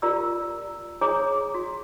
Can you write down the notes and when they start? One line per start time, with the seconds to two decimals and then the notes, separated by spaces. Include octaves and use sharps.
0.02 F4 G4 A#4 D5 A#5 E6
1.01 G#4 C#5 G#5 A#5 D6 D#6
1.55 F#4